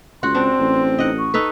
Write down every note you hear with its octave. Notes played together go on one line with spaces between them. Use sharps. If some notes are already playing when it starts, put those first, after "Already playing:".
C#2 F#4 F#5 C6
C4 D4
A1
D#4 D#5 F#5
C#6
D#4 A4 B4